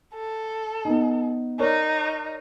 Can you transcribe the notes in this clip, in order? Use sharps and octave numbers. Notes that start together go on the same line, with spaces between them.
A4
B3 D#4
D#4 A#4 C#5 D5